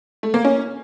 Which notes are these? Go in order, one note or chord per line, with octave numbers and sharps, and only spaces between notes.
A3
A#3
C#4